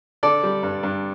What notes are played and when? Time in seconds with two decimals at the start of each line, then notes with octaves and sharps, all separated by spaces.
0.23 D3 A4 D5
0.43 G3
0.63 G2
0.83 G2